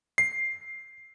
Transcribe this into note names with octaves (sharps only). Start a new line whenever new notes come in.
C7